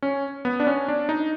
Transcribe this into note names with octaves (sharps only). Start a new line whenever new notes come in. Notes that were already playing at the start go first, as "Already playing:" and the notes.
C#4
B3
D4
C#4
D4
D#4